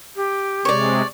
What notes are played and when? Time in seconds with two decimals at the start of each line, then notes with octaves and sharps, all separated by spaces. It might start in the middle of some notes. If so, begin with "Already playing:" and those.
0.16 G4
0.65 C3 G#3 C#5 D5